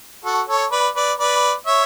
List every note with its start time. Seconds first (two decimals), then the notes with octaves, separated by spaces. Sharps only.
0.25 F#4 A4
0.49 A4 C#5
0.72 B4 D5
0.96 B4 D5
1.20 B4 D5
1.67 C#5 E5